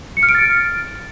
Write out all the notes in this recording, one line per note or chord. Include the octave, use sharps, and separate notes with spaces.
C#7
F6
D7
A6